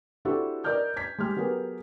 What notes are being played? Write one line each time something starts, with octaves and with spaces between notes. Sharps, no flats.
C4 D4 E4 F#4 G4 A4
A#4 D5 D#5 F6 G6
G#6 B6
G#3 G4 F6
F#3 B3 G4 G#4 A#4